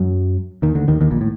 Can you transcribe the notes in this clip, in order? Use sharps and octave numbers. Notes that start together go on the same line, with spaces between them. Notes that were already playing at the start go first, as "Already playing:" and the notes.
Already playing: F#2 F#3
D#2 D#3
D2 D3
D#2 D#3
D#2 D#3
A#1 A#2
A2